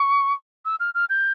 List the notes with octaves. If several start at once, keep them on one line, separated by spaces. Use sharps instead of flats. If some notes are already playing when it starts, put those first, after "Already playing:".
Already playing: C#6
E6
F6
F6
G6